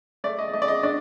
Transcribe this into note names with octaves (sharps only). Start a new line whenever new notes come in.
A3 D5
D#5
A3 D#5
D5
D#5
D4 D5